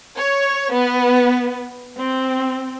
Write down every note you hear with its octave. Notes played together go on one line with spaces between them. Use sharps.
C#5
B3
C4